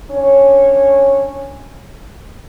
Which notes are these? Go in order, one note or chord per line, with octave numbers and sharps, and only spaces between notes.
C#4 D4 C#5